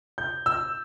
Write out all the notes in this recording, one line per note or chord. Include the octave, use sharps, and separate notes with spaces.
G6
E6